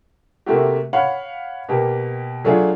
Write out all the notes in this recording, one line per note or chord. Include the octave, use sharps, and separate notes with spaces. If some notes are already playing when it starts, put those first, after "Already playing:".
C3 A3 A#3 C4 F#4 G4
C#5 F5 F#5 B5
B2 A#3 G4
F#3 A3 D4 F4 G#4